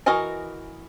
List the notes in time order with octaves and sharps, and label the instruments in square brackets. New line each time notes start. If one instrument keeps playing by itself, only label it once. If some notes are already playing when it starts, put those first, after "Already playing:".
[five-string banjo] E3 F#4 A#4 D#5 G#5